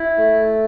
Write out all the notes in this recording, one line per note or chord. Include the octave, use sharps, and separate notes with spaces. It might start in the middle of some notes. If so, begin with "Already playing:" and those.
Already playing: E4
A3